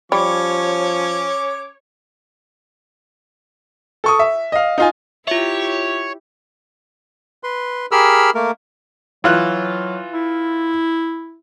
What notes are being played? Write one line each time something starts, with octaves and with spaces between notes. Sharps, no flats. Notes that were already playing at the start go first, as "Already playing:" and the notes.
F3 G3 C#4 C#5 D6
A4 C#6 D#6
E5
D#5 F5
D#4 F4 G#5
E4 F4 G4 C#5 E5
B4 C6
G4 G#4 A#4 B5 E6 F6
A3 A#3 A#4
E3 F#3 F4 F#6
E4